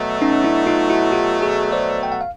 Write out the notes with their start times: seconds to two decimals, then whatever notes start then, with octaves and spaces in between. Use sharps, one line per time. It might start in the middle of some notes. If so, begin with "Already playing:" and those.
Already playing: B2 F#3 A3
0.22 C#4 D#4
0.44 D4 E4
0.67 D#4 F4
0.90 E4 F#4
1.12 F4 G4
1.42 F#4 G#4
1.72 C5 D5
2.03 G5
2.12 F#5
2.21 F5